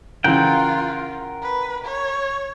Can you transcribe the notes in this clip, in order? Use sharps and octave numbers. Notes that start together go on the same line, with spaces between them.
C#3 E3 F4 A#4 F#5 G5
B4
C#5